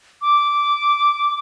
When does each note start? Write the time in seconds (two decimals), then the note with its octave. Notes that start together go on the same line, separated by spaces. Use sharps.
0.22 D6